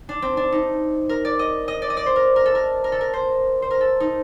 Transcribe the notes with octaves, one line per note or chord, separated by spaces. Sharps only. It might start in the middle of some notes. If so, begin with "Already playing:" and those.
D4
C4
D4
D#4
A#4
D5
D#5
D#5
D5
D#5
D5
C5
A#4
A#4
A4
A#4
A#4
A4
A#4
C5
C5
A#4
A4
D#4